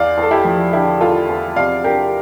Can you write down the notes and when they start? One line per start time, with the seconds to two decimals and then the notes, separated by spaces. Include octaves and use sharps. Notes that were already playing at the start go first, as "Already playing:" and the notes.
Already playing: E2 D5 F5
0.17 E2
0.22 A4
0.31 E4 G4
0.45 F3
0.73 D3 E4 G4
1.00 E2 F4 A4
1.29 E2
1.56 C3 D5 F5
1.84 D4 G4 A#4